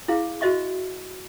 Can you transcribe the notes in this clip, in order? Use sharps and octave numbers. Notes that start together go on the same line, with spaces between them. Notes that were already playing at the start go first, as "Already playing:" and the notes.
E4 G#4 F5
F#4 C5 D#5 E5 C#6